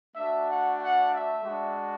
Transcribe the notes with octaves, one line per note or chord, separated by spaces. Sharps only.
A3 D4 F#4 E5
F#5
F#5
E5
G#3 D4 F#4